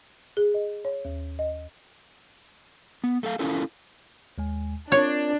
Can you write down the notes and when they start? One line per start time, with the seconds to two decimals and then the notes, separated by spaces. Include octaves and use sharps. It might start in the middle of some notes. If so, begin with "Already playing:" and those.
0.37 G#4
0.54 D#5
0.85 C#5
1.05 D#2
1.39 D#5
3.04 B3
3.23 A3 A4 F5
3.39 C#4 E4 F4 A4 A#4
4.38 D#2 G#3 G#5
4.92 C4 D4 F4 A#4 C#5